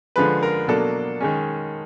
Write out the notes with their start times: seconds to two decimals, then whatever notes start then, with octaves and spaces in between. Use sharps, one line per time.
0.16 D3 F3 G#3 B4
0.43 A#4
0.68 B2 F#3 A#3 D4 A4
1.21 D#3 G#3 C#4